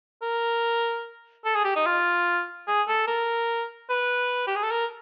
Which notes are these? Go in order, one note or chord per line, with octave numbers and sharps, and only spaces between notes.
A#4
A4
G#4
G4
D#4
F4
G#4
A4
A#4
B4
G4
G#4
A4
A#4